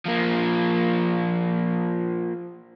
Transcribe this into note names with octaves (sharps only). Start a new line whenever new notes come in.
F3 A#3